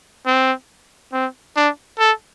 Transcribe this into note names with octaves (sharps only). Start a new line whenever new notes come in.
C4
C4
D4
A4